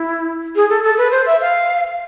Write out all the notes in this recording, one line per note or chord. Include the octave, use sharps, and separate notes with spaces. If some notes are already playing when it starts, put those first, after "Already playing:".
Already playing: E4
G#4
A4
A4
B4
C5
E5
F5